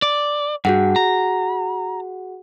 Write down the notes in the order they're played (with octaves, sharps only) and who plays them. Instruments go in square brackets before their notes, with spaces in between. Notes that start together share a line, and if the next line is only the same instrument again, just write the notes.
[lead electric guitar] D5
[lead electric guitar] G2 [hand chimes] F#4 G#4 F#5
[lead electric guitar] A#5